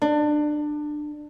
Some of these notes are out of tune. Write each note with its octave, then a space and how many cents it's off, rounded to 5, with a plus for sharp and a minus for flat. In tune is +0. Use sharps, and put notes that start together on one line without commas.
D4 +25